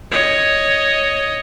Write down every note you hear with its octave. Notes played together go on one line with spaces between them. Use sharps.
C#5 D#5